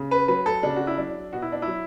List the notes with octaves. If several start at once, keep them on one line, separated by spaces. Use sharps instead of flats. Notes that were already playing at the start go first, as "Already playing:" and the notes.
Already playing: C#3
B4
F#3 B4
A4
C#3 D4
F#4
E4
F#3 D4
B2 F#4
E4
D4
F#3 E4